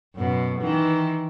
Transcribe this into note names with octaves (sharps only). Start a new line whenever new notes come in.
F#2 B2
D#3 E3